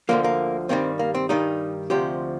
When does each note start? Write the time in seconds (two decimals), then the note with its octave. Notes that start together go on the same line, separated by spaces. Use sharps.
0.09 D2 D3 F3 A#3
0.24 A#3
0.69 G2 D#3 G3 C4
0.99 A#3
1.15 C4
1.29 G2 D#3 G3 D#4
1.90 D2 C3 F3 G4